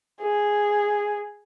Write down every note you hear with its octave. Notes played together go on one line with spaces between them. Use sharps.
G#4